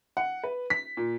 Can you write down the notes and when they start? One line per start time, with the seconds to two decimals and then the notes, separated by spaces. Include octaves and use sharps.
0.17 F#5
0.44 B4
0.70 B6
0.97 A#2